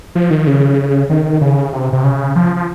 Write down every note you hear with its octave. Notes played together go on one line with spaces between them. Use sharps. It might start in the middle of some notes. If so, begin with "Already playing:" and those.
F3
D#3
C#3
D#3
C#3
C3
C3
C#3
F3
F3